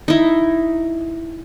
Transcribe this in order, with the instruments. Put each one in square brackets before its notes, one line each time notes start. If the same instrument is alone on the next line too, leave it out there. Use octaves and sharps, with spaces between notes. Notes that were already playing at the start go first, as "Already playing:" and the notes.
[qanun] D#4 E4